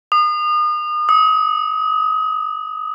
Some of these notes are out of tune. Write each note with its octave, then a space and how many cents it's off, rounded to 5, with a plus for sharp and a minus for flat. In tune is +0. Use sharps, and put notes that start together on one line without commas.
D#6 -35
D#6 +35